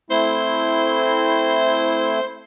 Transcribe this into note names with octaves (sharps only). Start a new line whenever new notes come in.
A3 C4 E4 C5